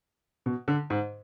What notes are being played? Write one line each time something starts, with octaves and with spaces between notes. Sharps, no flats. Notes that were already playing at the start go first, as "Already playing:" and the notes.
B2
D3
G#2